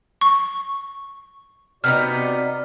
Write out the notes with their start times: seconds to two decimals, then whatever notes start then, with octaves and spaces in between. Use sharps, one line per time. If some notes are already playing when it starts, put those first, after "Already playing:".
0.21 C#6
1.84 C3 B3 D#4 F#4 D5 F6